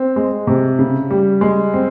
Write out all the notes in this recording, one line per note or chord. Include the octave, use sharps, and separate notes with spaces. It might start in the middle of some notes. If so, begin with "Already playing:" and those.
Already playing: C4
G#3
C3
C#3
G3
G#3
C4